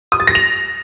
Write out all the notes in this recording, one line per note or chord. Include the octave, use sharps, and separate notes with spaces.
D#6
A6
A#6
F7